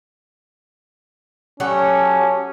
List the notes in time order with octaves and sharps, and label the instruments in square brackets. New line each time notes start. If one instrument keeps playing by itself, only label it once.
[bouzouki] F#3 A3 G4 [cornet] C#4